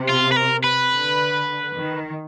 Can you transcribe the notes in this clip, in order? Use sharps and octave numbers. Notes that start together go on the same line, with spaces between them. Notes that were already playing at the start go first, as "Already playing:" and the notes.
Already playing: C3
F4
B4
A#4
B4
D3
D#3